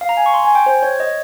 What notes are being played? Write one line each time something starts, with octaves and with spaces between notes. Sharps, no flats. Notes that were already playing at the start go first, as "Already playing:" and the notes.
F5
A#5
G#5
C#6
C6
G#5
G5
C5
C#5
D#5